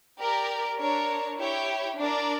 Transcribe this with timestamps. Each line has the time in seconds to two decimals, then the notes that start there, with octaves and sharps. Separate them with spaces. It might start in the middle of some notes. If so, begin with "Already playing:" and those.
0.19 G4 A#4 D5 G5
0.79 D4 A#4 C#5
1.38 E4 G4 C#5 G5
1.98 D4 A#4 D5